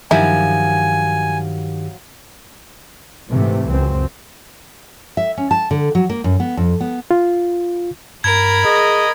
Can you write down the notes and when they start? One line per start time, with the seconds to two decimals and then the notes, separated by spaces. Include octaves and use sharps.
0.11 G2 D#3 F3 F#3 E4 G4 G#5
3.30 G#2 C3 E3 A3
3.69 C#2 F#2 C4
5.17 E5
5.37 C#4
5.51 A5
5.71 D3
5.95 F#3
6.09 A#3
6.24 F#2
6.40 B3
6.57 F2
6.81 B3
7.11 F4
8.24 G2 A#4 B5 G#6
8.65 G#4 D#5